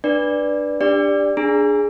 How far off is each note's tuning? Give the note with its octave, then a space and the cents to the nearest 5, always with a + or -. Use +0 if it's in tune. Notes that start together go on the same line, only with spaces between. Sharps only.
D4 +15 B4 -10 D5 +0
D4 +0 G4 +25 D5 +0
D4 +0 G#4 +0 A#5 +0